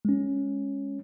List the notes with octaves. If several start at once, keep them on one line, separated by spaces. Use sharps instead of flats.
G#3 C#4